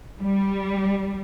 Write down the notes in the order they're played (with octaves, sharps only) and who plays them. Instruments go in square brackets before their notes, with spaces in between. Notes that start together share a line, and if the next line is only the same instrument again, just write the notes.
[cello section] G3